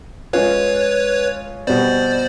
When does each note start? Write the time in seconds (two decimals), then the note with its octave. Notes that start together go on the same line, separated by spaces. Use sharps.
0.33 G#3 C#4 F4 B4 C#5
1.67 B2 G3 B3 C5 D5